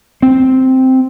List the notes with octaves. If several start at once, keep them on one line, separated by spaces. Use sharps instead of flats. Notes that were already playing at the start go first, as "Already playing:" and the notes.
C4